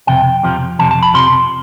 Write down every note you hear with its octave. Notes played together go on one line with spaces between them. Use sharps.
F2 C3 G5
F2 C3 F3
F2 C3 F3 A5
A5
B5
F2 C3 F3 C6